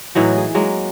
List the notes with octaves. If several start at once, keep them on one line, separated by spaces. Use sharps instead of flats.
A2 E3 F#3 D#4
G#4
F#3 G#3 A#3